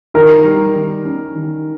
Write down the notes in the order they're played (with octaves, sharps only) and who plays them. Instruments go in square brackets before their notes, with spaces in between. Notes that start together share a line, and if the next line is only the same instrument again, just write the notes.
[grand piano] D#3 [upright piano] A#4
[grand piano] G3
D#3
C#4
D#3